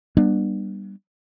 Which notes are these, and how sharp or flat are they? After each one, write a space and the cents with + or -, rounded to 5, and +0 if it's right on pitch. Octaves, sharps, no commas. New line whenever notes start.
G3 +0 B3 -35 D4 +30